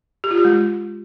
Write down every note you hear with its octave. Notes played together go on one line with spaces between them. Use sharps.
G4
F4
G4
G#3